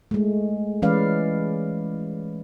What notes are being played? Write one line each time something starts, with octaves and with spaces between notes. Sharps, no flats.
G#3 A3
E3 G#3 C#4 B4 D5 F5